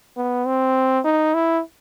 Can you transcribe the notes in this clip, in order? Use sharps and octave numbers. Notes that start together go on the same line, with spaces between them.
B3
C4
D#4
E4